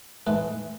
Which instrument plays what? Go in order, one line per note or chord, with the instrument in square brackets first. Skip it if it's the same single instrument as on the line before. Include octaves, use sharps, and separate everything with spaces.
[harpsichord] G#2 E3 A3 B4